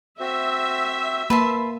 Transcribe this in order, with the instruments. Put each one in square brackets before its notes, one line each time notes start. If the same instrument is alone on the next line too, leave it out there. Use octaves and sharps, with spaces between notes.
[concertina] C4 F#4 C5 [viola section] E5
[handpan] A#3 [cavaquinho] B4 A5 C6